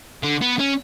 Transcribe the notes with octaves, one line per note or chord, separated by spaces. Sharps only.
D3
B3
C#4